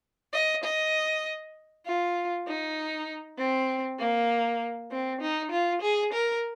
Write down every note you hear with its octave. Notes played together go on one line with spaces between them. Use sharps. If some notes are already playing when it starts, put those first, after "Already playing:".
D#5
D#5
F4
D#4
C4
A#3
C4
D#4
F4
G#4
A#4